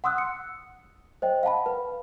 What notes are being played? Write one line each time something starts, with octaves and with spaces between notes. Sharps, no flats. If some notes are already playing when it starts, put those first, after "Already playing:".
F#5 C6 D#6 E6 F#6
C#7
C5 D#5 G5
F5 F#5 A5 B5
B4